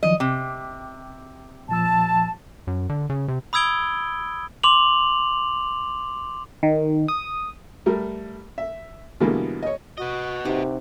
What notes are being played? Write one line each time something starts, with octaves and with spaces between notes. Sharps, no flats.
D#3 F3 F#3 D#5
C3 G5 D6
A#2 F3 A5 E6
F#2
D3
C#3
C3
B5 D#6 E6 G#6 D7 G7
C6 D6 F7 F#7
D#3
D#6
G3 A3 A#4
E5
B2 D3 E3 G3 G#3 A#3
C#5 D#5
F#4 B4 D#5
C3 D#4 G4 F#5